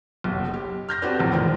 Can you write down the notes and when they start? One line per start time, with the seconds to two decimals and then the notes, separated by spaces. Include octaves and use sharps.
0.24 F#1 B1
0.54 G4
0.89 F6 G6 A#6
1.02 C4 F#4 G4 A4 B4 D5
1.19 A#1 E2 A2
1.33 A#2 D#3 F3 G#3